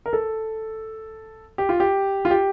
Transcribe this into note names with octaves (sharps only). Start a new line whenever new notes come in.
A#4
A4
G4
F4
G4
F4
G4